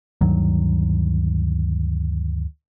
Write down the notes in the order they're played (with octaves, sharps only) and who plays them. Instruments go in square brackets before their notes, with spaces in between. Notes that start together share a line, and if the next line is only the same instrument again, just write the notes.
[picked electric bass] D2 G2 D#3 F#3